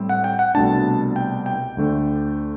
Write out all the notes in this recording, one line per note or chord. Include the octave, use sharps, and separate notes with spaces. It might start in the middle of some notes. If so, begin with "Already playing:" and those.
Already playing: A2 G3 C4
F#5
G5
F#5
C2 B2 A3 D4 A5
G5
G5
D2 D3 A3 D4